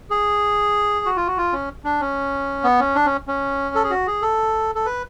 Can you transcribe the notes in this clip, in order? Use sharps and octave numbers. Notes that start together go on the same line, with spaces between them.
G#4
F#4
F4
F#4
F4
C#4
D4
C#4
B3
C#4
D4
C#4
C#4
A4
G#4
F#4
G#4
A4
A4
B4